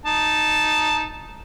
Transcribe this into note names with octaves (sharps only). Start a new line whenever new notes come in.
D#4 A5